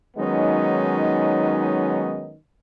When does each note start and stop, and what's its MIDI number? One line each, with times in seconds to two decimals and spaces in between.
0.17 2.35 51
0.17 2.35 54
0.17 2.35 56
0.17 2.35 59
0.17 2.35 61
0.17 2.35 63